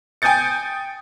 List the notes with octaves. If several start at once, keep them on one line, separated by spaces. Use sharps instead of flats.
G5 G#5 D#6 G6 A6 C#7